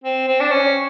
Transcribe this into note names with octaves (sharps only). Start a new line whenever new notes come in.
C4
C4
D4
C#4